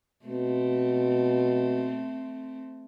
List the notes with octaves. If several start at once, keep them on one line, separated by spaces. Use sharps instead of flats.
B2 A3 C4